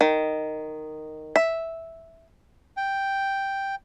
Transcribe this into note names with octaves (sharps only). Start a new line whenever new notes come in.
D#3
E5
G5